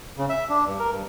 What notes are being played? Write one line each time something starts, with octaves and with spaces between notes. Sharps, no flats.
C#3
E5
D4
G2
A#4
G2